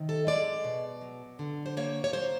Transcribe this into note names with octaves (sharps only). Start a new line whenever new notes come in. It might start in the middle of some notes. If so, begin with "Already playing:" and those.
Already playing: C3 D#3
A4
G#3 D5
B2
F#3
D3
C5
A#3 C#5
C#5
F#3 C5